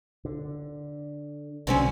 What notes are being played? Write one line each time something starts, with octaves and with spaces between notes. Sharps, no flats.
D3
B1 D3 E3 F#3 C4 C#4